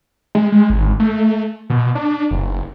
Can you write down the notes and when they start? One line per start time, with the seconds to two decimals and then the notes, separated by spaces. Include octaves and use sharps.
0.35 G#3
0.52 G#3
0.70 G#1
1.00 A3
1.70 B2
1.95 D4
2.31 F#1